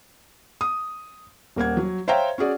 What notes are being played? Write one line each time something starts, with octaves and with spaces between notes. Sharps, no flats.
D#6
D#1 A#3 F#5 G#6
F#3
C5 C#5 E5 F5 G5 A#5
C#4 F#4 G#4 D5